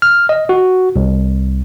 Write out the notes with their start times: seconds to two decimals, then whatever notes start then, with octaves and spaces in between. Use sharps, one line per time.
0.02 F6
0.29 D#5
0.49 F#4
0.96 C2